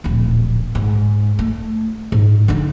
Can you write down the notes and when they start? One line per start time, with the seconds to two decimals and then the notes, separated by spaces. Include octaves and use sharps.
0.04 D1 A#1
0.75 G#2
1.39 A3
2.12 G#2
2.48 D3 D#4